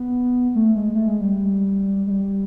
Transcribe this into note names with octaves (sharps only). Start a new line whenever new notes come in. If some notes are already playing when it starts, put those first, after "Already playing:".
Already playing: B3
A3
G#3
A3
G#3
G3
G#3
G3